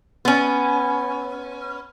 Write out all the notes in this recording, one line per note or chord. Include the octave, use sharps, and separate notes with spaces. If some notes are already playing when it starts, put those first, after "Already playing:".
B3 C#4